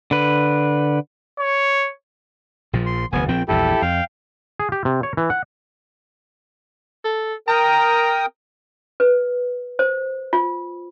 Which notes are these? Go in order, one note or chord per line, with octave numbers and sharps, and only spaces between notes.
D3 B4
C#5
A#1 A#2 F3
C6
F1 D2 B3 G#5
A#1 F3 C4 G5
A#1 E2 G2 E4 G4 A4
F2 F5 G5
G#4
G4
C3
C#5
E3
F#5
A4
A#4 G5 A#5 D#6
B4
C5
F4